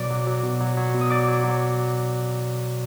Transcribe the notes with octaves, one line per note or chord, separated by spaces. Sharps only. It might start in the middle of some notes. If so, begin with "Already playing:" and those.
Already playing: B2 F#3 D5 D6
F#3
F#3
B2
F#3
F#3
B2
D#6
F#3 D5 D6
F#3
F#3